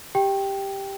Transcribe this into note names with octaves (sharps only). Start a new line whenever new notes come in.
G4 G5